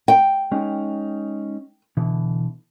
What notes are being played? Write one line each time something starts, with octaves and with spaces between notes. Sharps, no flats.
G5
G#3 C#4 D#4
B2 D3 E3